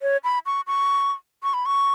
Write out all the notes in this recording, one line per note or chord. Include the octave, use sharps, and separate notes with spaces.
C#5
B5
C#6
C#6
C#6
B5
C#6